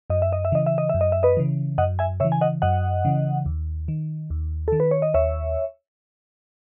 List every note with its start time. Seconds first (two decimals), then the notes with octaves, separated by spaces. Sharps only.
0.10 F#2 D#5
0.22 E5
0.32 D#5
0.45 E5
0.52 C#3 E3 D#5
0.66 E5
0.78 D#5
0.89 F#2 E5
1.01 D#5
1.12 E5
1.23 B4 D#5
1.37 C#3 E3
1.78 F#2 D#5 F#5
1.99 E5 G#5
2.20 C#3 E3 C#5 E5
2.32 G#5
2.41 D#5 F#5
2.62 F#2 D#5 F#5
3.05 C#3 E3
3.46 D#2
3.88 D#3
4.30 D#2
4.68 D#3 A4
4.80 B4
4.91 C#5
5.02 D#5
5.14 D#2 C#5 E5